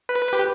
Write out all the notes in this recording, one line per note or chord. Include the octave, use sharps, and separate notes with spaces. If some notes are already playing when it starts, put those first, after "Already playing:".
B4
G4